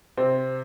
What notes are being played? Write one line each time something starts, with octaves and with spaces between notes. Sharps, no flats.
C3 C4